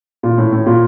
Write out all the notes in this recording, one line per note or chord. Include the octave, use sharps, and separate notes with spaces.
A#2
A2
A2
A#2